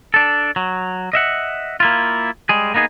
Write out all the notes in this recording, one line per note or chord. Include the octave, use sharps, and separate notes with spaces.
D4 A4
F#3
D#5 E5 F#5
A#3 E4 F4
G3 G#3 G#4
A#3 B3 D#4 G#4